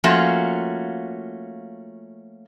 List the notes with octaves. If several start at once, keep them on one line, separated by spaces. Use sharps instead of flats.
F3 A3 A#3 C#4 F4 F#4